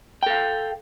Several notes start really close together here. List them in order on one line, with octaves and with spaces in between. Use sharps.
G5 A4 F5